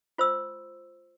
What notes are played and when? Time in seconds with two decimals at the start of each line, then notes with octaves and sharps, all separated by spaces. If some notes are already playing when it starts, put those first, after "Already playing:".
0.18 F4 C5 C6 E6